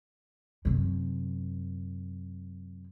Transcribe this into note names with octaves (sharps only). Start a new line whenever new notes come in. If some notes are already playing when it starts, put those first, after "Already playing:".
F#2 C3